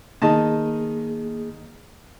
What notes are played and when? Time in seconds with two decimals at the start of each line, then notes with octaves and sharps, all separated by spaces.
0.22 D#3 A#3 G#4 D#5 A5